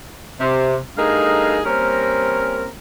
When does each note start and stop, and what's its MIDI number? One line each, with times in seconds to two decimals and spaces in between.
0.40 0.77 48
0.97 1.59 43
0.97 1.59 57
0.97 1.59 63
0.97 1.59 68
0.97 1.59 70
0.97 1.59 77
1.65 2.68 55
1.65 2.68 58
1.65 2.68 60
1.65 2.68 61
1.65 2.68 70